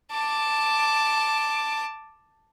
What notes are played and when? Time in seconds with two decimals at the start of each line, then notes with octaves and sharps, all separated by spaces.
0.11 A5 D6